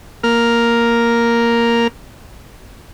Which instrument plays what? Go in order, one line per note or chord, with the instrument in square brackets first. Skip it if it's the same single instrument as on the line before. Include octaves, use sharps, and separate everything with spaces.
[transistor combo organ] A#3 A#4 F6